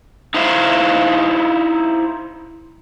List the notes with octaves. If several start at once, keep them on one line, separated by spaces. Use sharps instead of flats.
D#4 E4 C5 E5 F5